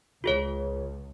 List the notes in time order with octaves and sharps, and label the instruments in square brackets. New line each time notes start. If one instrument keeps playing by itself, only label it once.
[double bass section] C#2 [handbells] F4 G#4 C#5